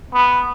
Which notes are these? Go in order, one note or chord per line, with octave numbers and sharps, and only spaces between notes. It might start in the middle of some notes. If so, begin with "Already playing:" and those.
B3